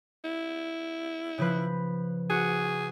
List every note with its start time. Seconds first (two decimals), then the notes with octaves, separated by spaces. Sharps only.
0.25 E4
1.38 C#3 F3 B4
2.30 F#4 G#4